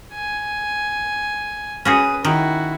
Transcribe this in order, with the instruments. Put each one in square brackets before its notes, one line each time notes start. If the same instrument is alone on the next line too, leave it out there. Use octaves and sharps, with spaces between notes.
[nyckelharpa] G#5
[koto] C#4 F#4 G#4 [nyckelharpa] B4 D#6
[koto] D#3 [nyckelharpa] E4 F#4